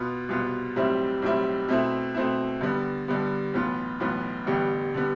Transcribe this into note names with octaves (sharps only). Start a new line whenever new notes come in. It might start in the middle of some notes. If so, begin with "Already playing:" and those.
Already playing: B2 B3 F4
C2 B2 B3 F4
B1 A2 G3 C4 E4
B1 A2 G3 C4 E4
B2 A3 C4 E4
B2 A3 C4 E4
G2 D3 G3 B3
G2 D3 G3 B3
B1 A2 E3 B3 F4
B1 A2 E3 B3 F4
A1 G2 D3 G3 B3
D3 G3 B3